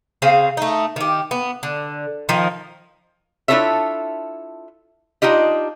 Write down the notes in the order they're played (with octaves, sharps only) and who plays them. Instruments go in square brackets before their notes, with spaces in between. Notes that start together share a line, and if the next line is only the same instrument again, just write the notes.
[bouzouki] C#3 C4 G#4 F5
A3 D#4
D#3 G4
B3
D3
D#3 F3 D#4
[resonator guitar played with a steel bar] D4 E4 F4 A4 C#5 E5
D4 D#4 F4 G4 D#5